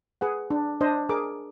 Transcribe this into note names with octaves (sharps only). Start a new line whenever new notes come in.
G#4 B4 F#5
D4
D4 C5 D#5
G#4 A#4 D6